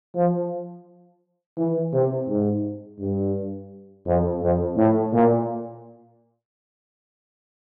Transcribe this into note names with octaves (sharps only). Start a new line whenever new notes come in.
F3
E3
C3
G#2
G2
F2
F2
A2
A#2